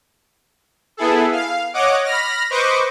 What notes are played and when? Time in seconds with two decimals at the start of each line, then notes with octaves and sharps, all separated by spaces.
0.97 B3 E4 G#4 A4
1.32 F5
1.74 C#5 D#5 F#5 D6
2.04 B5 F6 A#6
2.50 B4 C5 D#5 C#6 D6